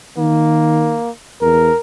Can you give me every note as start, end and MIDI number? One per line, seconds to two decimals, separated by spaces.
0.18 0.98 51
0.18 1.10 58
1.41 1.70 40
1.41 1.80 70